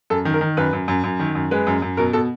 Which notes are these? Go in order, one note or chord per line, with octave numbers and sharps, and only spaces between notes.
F#2 A4
D#3
A#4
D#3
F#2 B4
F#2
F#2
F#2
D#3
F#2
G#3 B4
F#2
F#2
B2 A#4
B2 A4